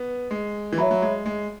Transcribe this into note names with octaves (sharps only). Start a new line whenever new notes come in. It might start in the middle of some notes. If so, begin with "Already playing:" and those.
Already playing: B3
G#3
E3
F#3 C#5 E5 B5
F#3
G#3
G#3